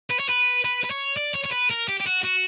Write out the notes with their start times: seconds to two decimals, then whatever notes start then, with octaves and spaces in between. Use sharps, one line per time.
0.11 B4
0.20 C#5
0.29 B4
0.64 B4
0.84 B4
0.91 C#5
1.17 D5
1.35 C#5
1.45 C#5
1.53 B4
1.71 A#4
1.88 G4
2.00 G4
2.06 F#4
2.23 F#4